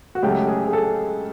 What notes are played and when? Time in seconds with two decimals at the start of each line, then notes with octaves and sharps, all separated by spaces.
0.15 F#4
0.22 C#2 C#3 F#3 A3 G4
0.48 G#4
0.66 G#4
0.73 A4